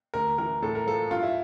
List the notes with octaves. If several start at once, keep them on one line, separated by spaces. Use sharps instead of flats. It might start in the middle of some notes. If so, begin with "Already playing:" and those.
D2 A#4
E3 A#4
A2 A4
A#4
F3 A4
G2 F4
E4